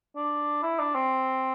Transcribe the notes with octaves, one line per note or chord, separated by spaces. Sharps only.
D4
E4
D4
C4